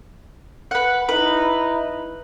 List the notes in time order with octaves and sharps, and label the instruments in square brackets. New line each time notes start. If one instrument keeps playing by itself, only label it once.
[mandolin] B4 F#5
[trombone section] D#4 E4 [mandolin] B4